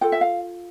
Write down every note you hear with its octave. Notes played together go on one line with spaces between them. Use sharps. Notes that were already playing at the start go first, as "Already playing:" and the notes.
F4 A4 G5
E5
F5